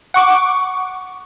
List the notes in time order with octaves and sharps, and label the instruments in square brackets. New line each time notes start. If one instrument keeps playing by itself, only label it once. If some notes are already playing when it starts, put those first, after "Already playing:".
[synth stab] F#5 C#6 D6